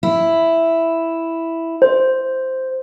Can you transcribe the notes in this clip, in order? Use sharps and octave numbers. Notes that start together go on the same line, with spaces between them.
E4
C5